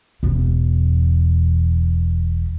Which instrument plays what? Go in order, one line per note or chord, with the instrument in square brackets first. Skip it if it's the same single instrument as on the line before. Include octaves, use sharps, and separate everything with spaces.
[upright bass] E1 E2